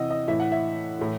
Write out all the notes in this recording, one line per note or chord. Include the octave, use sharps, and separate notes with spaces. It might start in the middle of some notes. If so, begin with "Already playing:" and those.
Already playing: C3 E3 D#5 F#5 E6
D#5
A2 E3 E5
F#5
E5
A2 E3